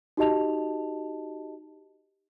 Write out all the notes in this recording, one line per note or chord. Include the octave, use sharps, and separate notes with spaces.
D#4 F#4 G4 D#5 A5 F7